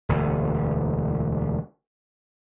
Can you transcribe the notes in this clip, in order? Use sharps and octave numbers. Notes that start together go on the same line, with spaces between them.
E1 D2